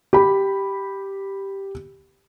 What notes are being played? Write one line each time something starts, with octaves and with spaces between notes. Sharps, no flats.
G4 B5